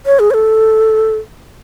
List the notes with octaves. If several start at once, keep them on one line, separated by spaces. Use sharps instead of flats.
C#5
G#4
C#5
A4